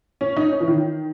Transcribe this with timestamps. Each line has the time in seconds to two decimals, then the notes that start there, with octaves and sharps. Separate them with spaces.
0.21 C#4
0.37 D#4
0.52 C#4
0.60 E3
0.68 D#3